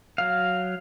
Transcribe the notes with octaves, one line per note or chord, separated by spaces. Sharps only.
F#3 F5